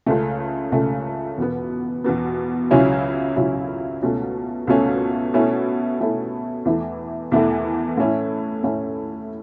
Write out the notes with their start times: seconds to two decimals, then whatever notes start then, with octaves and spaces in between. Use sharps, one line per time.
0.06 C#2 C#3 A3
0.72 C#2 C#3 A3
1.38 E2 B2 B3
2.04 E2 B2 B3
2.71 C#2 C#3 F#3 C#4 E4
3.36 C#2 C#3 F#3 C#4 E4
4.02 C#2 B2 A3 C#4
4.67 C#2 B2 A3 C#4
5.34 B2 A3 C#4 E4
5.99 B2 A3 C#4 E4
6.65 E2 E3 A3 E4
7.32 E2 E3 A3 E4
7.97 A2 A3 C#4 E4
8.64 A2 A3 C#4 E4